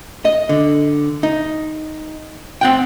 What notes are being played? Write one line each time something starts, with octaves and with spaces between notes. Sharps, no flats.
D#5
D3
D#4
C4 F#5 G5